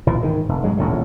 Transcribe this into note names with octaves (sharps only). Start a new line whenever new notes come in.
B1 A#2 E3
G#2 D#3
F1
G#2 F#3 G#3
E1 A#1 D#2 A2